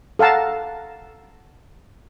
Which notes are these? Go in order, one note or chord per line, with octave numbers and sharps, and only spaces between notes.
A4 F5 F#5 A5 A#5